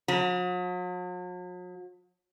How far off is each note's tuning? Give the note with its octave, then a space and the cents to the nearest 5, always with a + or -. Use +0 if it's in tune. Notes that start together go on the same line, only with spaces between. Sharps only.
F#3 -45